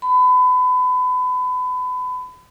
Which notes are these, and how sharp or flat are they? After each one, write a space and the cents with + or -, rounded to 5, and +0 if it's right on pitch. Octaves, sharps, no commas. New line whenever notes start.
B5 +30